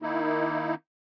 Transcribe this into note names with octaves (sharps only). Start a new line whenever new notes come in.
D#3 A#3 D#4 E4